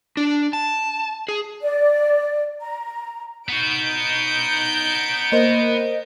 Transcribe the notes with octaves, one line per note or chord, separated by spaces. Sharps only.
D4
A5
G#4
D5
A#5
B3 D#4 F#4 G6 D7
A#3 A#4 C5 D#5